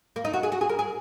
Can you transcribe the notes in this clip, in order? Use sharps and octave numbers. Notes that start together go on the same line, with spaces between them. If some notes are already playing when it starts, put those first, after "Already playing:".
A#3
D#4
F#4
G#4
F#4
G#4
A#4
G#4